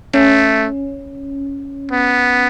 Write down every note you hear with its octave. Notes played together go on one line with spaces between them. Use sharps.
A3 C#4
B3